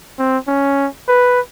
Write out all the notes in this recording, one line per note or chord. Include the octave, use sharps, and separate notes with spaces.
C4
C#4
B4